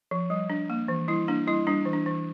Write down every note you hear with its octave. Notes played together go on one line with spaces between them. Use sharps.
F3
G3
D4
A#3
E3
G3 E4
A#3 D4
G3 E4
G3 D4
E3
D4
E3